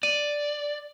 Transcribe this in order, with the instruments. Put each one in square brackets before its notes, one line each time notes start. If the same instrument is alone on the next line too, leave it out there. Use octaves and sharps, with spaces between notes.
[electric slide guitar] D5 [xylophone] D#7